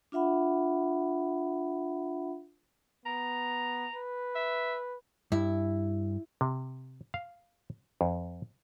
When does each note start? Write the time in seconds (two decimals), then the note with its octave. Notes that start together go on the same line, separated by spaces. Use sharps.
0.12 D4 F4 E5 F#5 B5
3.06 B3 A#5
3.93 B4
4.35 E5
5.32 G2 E4
6.41 C3
7.14 F5
8.01 F2